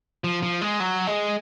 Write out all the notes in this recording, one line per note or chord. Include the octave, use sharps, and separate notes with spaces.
F3
F3
G#3
F#3
G#3